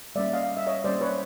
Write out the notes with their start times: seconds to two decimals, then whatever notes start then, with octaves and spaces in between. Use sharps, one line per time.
0.15 G3 A#3 C#4 D5 E5
0.33 D#5 F5
0.57 E5
0.67 C#5 D#5
0.84 G3 A#3 C#4 C5 D5
1.01 B4 C#5